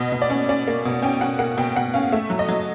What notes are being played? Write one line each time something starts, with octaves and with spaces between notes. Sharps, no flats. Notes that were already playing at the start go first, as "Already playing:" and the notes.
Already playing: B2 D#5
B2
D5
C#4
C#4 D5
A#3
B2
C#4 G5
C#4 F#5
A#3 F#5
B2 G5
B2 F#5
C#4 F5
A3 E5
F#3
D#5
F#3